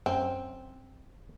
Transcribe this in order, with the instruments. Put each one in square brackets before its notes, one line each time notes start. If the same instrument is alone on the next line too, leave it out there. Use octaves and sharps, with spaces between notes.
[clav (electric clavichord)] F#2 [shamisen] C4